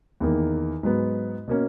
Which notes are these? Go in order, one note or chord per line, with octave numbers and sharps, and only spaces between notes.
E2 D#3 A#3
G#2 F#3 B3
B2 A#3 C#4